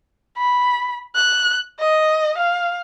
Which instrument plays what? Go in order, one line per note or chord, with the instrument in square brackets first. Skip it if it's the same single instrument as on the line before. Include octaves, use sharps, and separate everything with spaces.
[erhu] B5
F#6
D#5
F5